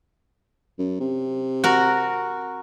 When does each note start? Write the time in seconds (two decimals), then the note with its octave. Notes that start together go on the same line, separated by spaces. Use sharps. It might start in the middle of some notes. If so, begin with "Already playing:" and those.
0.78 F#2
1.00 C3
1.64 F#4 A#4